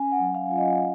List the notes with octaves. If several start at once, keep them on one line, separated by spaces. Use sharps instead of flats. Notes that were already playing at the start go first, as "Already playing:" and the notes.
Already playing: C#4 G#5
F#5
F#3
F5
F4
D#5